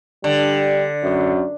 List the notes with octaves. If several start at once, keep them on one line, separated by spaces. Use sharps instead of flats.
D3 G3
F#2